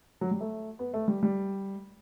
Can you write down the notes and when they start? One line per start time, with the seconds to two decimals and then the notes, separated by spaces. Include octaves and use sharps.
0.21 F#3
0.31 G3
0.41 A3
0.79 B3
0.94 A3
1.08 G3
1.23 G3